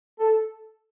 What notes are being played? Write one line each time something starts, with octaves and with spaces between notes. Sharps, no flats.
A4